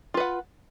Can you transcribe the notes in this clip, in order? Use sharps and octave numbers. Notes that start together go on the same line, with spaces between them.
F4 B4 F#5